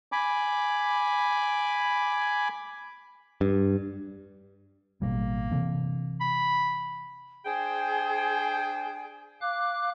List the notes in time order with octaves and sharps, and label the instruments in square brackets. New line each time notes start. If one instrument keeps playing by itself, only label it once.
[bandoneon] G#5 B5 D6
[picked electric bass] G2
[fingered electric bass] A1 B2 G3 [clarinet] A#3
[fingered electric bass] C3 E3 C4
[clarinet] B5
[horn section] D4 C5 G5 [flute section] G#4
[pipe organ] F5 D6 F#6